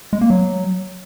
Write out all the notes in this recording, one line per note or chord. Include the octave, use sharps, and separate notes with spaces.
G#3
A#3
F#3